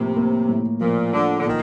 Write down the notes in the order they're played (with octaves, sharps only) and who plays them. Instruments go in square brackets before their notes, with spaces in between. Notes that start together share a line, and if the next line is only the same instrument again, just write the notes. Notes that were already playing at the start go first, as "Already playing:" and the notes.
Already playing: [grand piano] A2 F3 A#3 [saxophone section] C3
[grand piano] A#3
A2
[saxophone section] A#2 [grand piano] F3
[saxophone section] D3 [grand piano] F3
[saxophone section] D3
[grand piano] A#2 [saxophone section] D#3